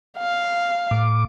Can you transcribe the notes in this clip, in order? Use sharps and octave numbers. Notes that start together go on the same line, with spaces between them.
F5
A2 D6